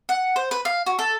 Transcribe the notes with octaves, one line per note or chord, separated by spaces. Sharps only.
F#5
C5
B4
F5
F#4
A4